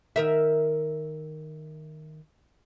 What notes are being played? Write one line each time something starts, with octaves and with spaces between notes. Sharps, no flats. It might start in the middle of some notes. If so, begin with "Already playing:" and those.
D#3 A#4 E5